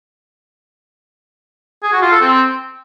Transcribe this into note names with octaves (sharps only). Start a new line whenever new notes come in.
G#4
F#4
F4
A4
C4